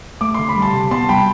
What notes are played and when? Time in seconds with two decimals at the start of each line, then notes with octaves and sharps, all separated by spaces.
0.21 A3 D6
0.34 D3 C6
0.49 B5
0.56 G3
0.62 A5 C6
0.74 C3
0.91 B3 A5 C6
1.09 G3 G5 B5